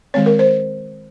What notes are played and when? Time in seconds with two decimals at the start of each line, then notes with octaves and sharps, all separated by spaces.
0.14 D#3 G#3 C4 C#5
0.26 A#4
0.39 C5